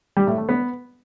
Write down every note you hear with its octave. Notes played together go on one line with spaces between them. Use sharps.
G3
A2
A3
B3